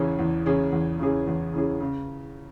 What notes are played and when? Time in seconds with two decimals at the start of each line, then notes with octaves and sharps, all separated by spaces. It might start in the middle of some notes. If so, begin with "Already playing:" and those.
Already playing: E2 C#3 E3 C#4 G#4
0.19 E2
0.46 C#3 E3 C#4 G#4
0.72 E2
0.99 C#3 E3 C#4 G#4
1.27 E2
1.54 C#3 E3 C#4 G#4
1.80 C#3